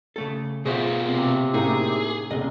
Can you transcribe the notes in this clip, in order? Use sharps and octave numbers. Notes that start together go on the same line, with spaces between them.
C#3 A3 A4
B2 F4 G#4 C5 E5
C3 C4
A2 A#3 C#4 D#4 G#4 A#5
F1 C#2 A#2 D#5